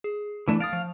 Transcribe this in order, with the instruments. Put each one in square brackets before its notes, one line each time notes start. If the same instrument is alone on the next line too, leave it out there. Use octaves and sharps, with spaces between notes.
[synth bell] G#4
[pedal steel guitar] E3 A3 D4
[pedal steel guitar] F5 [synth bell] D#6 A6 D7
[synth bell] F3